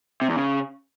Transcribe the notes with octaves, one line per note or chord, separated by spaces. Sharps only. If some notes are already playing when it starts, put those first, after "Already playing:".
C3
E2
C#3